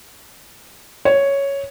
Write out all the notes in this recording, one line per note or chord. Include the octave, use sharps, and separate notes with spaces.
C#5